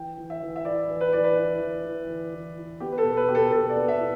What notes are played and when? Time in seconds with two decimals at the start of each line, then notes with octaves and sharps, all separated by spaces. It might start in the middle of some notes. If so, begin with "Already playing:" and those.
Already playing: E3 G5
0.17 E3
0.30 E5
0.42 E3
0.56 E5
0.65 E4 D5
0.89 E3
1.01 B4
1.13 E3 D5
1.24 B4
1.37 E4
1.61 E3
1.85 E3
2.08 E3
2.33 E3
2.57 E4
2.80 B3 G4
2.92 B4
2.98 A4
3.04 B2
3.17 B4
3.28 B2 G4
3.35 A4
3.52 B2 A4
3.70 D5
3.76 B3
3.88 E5
4.00 E4